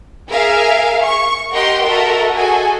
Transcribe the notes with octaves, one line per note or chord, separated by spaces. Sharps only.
G#4 A#4 E5 F5
C#6
G4 A#4 D#5 F#5 G5 C6
F#4 A4 A#4 D#5 E5
F#4 G#4 A4 G#5